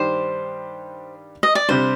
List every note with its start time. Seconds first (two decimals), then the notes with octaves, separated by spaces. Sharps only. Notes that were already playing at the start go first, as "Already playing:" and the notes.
Already playing: G2 D#3 G3 D4 G4 C5
1.43 D#5
1.55 D5
1.69 C3 G3 D4 C5